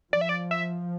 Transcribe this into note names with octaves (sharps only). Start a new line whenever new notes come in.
F3 D5
E5
D5
E5